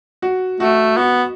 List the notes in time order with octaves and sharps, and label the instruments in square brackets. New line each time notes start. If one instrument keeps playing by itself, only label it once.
[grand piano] F#4
[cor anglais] A3 [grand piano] F#4
[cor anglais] B3 [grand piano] F#4